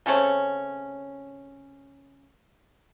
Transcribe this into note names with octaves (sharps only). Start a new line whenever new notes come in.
C#3 A3 C4 C#4